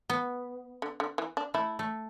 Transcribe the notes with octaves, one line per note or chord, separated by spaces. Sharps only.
B3
D3
D3
E3
D4
A3 E4
A3